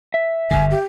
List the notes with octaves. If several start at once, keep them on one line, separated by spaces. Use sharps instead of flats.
E5
G1 G2 D3 G#5
G4